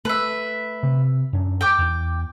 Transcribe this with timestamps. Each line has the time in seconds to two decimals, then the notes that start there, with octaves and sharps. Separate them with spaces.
0.05 A3 B4 E5
0.83 C3
1.33 F#2 C#4 D4
1.61 G5 D6
1.78 E2